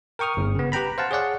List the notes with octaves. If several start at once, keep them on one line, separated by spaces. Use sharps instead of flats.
A#4 G5 C#6 D#6 F6
G1
C#3 B3
G4 B4 G5 A#5 B5
C5 F5 F#5 A5
G#4 C#5 D5 F#5